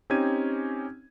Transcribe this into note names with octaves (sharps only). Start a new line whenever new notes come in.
C4 C#4 D#4 G4 G#6 D#7